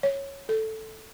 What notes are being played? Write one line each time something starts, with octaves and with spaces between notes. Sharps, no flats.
C#5
A4